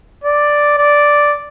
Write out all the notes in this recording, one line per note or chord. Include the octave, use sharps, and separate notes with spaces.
D5
D5